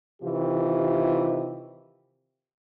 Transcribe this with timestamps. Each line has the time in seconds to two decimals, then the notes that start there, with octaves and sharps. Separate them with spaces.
0.23 C3 D#3 E3 F4 G4